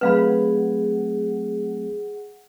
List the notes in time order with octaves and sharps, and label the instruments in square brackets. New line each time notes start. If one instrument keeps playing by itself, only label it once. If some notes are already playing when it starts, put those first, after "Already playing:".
[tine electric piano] F#3 A3 C4 [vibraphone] G#4 F#5 [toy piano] B4 F5 B5